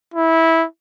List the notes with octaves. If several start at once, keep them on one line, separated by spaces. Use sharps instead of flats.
E4